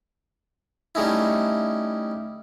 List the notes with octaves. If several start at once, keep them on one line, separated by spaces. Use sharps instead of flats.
G3 A3 C#4 D#4 E4